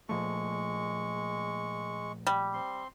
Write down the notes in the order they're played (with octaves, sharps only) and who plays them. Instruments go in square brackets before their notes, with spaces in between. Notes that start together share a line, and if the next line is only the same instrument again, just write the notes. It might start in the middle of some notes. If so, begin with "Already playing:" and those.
[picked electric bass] A#2 F3 A3 [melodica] G#3 C#6
[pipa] G3
[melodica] C4 C6